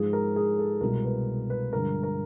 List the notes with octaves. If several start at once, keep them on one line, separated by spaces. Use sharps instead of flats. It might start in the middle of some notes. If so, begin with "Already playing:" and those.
Already playing: G#2 F3 G#3 G#4
A#4
G#4
A4
C2 B2 G#3 A#4
B4
B4
G2 D3 F3 G#3 A#4
A#4